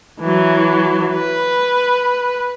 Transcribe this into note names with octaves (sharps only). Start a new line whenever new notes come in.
E3 F#3
B4